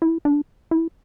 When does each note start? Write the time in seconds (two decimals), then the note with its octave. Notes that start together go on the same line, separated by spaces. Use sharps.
0.02 E4
0.25 D4
0.71 E4